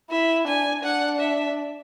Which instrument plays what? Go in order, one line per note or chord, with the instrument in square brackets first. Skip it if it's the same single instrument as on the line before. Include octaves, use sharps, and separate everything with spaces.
[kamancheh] E4 [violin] E5
[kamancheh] D4 [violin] G#5
[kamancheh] D4 [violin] F#5
[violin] E5